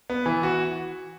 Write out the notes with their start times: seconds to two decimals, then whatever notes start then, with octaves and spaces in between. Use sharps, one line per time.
0.10 B3
0.26 E3
0.43 F#4